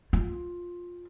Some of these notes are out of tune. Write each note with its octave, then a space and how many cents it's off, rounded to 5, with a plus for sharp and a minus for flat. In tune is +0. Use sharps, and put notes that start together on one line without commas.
F4 +10